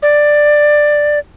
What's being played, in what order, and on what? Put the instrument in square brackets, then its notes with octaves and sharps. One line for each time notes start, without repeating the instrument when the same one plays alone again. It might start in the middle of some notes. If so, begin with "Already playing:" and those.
[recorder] D5